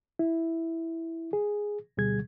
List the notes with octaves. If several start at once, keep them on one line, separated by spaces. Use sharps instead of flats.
E4
G#4
D2 B2 G3 G#4 G#6